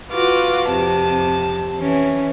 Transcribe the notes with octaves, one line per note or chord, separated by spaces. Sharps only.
F4 F#4 B4 D6
F2 C3 A5
E3 C#4